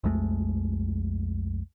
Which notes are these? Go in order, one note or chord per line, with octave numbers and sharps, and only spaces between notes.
B1 F2 G#3 A3